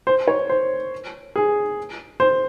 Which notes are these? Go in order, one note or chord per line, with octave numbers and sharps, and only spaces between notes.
C5
C#5
C5
G#4
C5